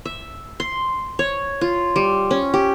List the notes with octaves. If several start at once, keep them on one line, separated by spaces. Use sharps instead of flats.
E5
C6
C#5
F4
G3
C#4
G4